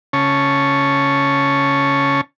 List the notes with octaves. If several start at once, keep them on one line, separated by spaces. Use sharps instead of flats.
C#3 C#4 C#5 A5